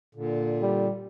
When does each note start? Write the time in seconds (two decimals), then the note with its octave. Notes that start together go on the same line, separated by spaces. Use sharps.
0.15 A#2 D3
0.61 G3